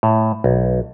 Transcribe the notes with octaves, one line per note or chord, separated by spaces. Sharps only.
A2
B1